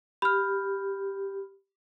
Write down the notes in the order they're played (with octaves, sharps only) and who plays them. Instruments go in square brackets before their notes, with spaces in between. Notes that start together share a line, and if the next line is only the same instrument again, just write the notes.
[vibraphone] G4 [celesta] B5 F6